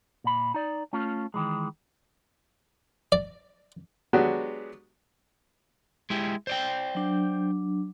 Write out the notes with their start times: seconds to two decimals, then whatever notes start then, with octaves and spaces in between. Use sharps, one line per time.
0.24 A#2 B5
0.54 D#4 D5
0.93 A3 C#4 F4
1.34 D#3 E3 G#3
3.12 D5
4.13 F#3 G#3 B3 D4 F#4 G4
6.10 G#3 E4 G4
6.47 C5 D5 G5
6.95 F#3 D4